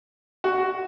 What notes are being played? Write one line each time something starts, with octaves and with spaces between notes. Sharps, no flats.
F#4
F#4